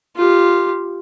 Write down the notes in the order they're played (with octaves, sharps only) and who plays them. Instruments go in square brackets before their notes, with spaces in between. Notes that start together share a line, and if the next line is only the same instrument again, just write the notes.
[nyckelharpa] F4 G4